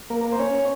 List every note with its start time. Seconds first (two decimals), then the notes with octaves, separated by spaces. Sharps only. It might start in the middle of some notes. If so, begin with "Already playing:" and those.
0.10 A#3 A#4
0.25 A#4
0.32 C5
0.39 C#4 C#5